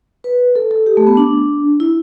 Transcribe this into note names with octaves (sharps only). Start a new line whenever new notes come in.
B4
A4
A4
G4
A3
B3
D4
E4